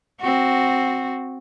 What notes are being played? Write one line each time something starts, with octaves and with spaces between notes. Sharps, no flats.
C4 F#4